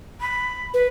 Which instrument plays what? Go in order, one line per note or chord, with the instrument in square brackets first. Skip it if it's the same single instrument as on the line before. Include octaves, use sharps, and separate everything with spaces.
[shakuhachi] B5
[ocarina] B4